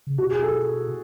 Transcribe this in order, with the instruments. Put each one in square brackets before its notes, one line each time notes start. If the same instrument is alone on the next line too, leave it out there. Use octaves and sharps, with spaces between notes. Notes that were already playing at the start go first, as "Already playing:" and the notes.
[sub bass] C#3
[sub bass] B2 [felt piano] F#4
[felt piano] G#4
A4